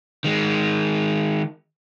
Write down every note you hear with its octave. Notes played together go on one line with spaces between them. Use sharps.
D#3 G#3